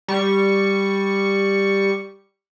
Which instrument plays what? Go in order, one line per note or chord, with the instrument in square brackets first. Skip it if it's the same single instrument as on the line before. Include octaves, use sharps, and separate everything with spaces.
[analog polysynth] G3 C#6